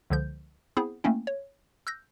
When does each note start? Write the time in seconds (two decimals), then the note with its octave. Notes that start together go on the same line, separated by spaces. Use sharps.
0.10 C#2 D3 F3 G6
0.77 B3 C4 E4 G#4 C5
1.04 A3 A#3 C4 C#4 E4
1.27 C#5
1.87 E6 F#6 G6 A#6